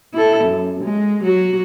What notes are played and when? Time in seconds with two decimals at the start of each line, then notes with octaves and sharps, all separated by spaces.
0.14 E4 A4
0.44 F#2
0.84 G#3
1.24 F#3 F#4